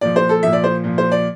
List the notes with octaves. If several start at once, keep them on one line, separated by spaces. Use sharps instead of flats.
A#2 F3 D5
C5
A4
A#2 F3 E5
D5
C5
A#2 F3
C5
D5